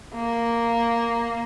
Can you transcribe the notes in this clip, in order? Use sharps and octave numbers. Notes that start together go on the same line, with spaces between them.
A#3